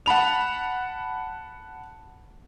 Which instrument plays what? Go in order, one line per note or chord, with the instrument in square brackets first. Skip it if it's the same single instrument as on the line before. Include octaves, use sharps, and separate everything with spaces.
[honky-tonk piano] F#5 A5 B5 F7